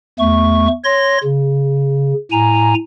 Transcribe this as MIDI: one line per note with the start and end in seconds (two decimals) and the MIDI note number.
0.19 0.68 40
0.19 0.68 57
0.19 0.68 85
0.84 1.18 73
0.84 1.18 84
0.84 1.18 94
1.23 2.13 49
2.32 2.74 45
2.32 2.74 80
2.32 2.74 82